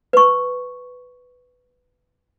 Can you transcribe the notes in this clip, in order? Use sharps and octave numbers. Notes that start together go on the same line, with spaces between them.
B4 C#6